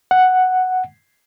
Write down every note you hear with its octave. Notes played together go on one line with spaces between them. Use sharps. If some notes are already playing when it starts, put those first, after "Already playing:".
F#5